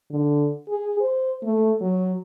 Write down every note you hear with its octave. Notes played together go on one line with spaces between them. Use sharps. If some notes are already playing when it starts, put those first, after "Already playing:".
D3
G#4
C5
A3
F#3